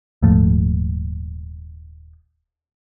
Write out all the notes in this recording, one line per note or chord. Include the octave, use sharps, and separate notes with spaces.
D#1 G#2 F3 A3